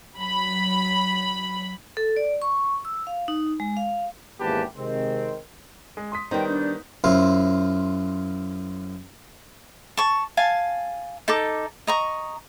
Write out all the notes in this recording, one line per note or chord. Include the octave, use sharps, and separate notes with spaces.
F#3 B5
A4
D5
C#6
E6
F5
D#4
G#3
F5
G#1 E2 A#3 G4 B4 A5
C3 D#3 G#3 C4
G#3
C6 D#6 B6
D#3 G3 B3 D#4 C5 G5
D4 G6
F#2 E4 F4 C5
A5 C#6
F5 G#5 A5
D#4 A4 D6
D#5 A#5 C#6